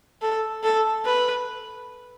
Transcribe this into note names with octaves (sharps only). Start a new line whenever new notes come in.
A4
A4
B4